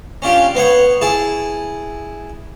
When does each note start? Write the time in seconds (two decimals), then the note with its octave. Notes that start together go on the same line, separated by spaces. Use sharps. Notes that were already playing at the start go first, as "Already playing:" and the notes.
0.22 C#4 D4 F4 G4
0.55 B3 C5 C#5 F#5
1.01 E4 G#4 A5